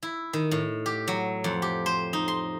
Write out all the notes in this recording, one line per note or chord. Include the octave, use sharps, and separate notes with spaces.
E4
D#3
A2
G4
F#3
F2
G4
C5
D#4
C6